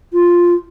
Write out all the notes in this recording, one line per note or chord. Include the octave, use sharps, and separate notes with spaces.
F4